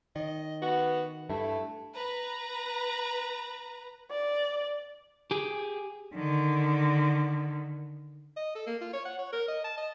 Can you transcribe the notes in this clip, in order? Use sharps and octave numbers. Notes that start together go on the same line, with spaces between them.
D#3 D#5
B3 F#4
G2 A3 E4
B4 A#5
D5
G4 G#4
D3 D#3
D#5
A4
A#3
F4
C#5
F#5
C#5
A#4
D#5
A5
D#5